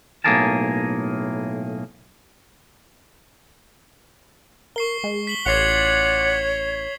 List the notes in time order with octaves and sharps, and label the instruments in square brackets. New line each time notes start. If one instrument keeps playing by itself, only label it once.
[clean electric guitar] B1 A2 A#3 G#4 A#4 A5
[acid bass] A#4 [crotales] C#6 C7 G7
[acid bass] G#3
[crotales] B6 F#7 G7
[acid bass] A1 [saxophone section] F4 D5 F#5 [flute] C#5 [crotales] G#6 C7 F7